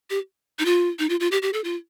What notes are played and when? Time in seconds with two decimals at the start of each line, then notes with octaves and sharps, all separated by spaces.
0.10 G4
0.59 D#4
0.65 F4
0.99 D#4
1.09 F4
1.20 F4
1.31 G4
1.42 G4
1.53 A4
1.64 F4